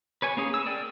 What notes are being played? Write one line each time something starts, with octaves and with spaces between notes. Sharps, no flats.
B4 C#5 G#5
A#3 C#4 G#4
E6
G#4 A#4 D5 G5